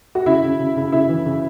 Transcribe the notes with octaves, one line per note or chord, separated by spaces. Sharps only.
F#4
C#3 E4
C#3
C#3
C#3
C#3 E4
E3
C#3